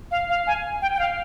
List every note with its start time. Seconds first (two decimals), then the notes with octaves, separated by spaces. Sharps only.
0.11 F5
0.29 F5
0.47 G#5
0.82 G5
0.94 G5
0.99 F5